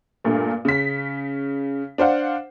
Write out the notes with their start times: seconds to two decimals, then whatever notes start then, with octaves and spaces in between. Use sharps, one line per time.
0.24 G2 A#2 A3
0.65 C#3 B6
1.98 D4 C5 F5 F#5